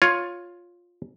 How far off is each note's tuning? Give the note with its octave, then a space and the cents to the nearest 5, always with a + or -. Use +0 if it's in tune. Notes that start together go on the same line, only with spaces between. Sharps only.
F4 +10 C#5 +5